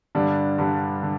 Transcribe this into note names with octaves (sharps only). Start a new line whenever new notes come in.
G2 D3 G3 D4
G2 D3 G3 D4
D3